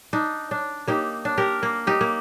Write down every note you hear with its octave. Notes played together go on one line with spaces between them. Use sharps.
D4 D#4
D4
A#3 D#4 G4
D4
G4 A#4
A#3
D#4 G4
A#3